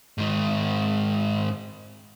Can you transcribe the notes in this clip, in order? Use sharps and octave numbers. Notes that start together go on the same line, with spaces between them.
G#2 D#3